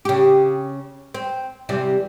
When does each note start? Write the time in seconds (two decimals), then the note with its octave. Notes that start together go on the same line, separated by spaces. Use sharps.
0.05 C#3 G4
1.14 C4
1.69 E2 C3 G3